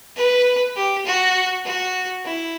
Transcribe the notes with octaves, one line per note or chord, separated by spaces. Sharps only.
B4
G4
F#4
F#4
E4